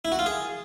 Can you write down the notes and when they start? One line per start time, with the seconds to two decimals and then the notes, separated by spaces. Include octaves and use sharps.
0.05 E4
0.12 F#4
0.19 F4
0.26 G#4